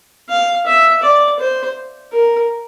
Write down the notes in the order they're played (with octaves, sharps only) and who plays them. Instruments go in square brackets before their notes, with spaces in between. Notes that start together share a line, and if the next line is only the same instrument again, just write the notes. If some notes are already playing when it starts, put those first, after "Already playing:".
[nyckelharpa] F5
E5
D5
C5
A#4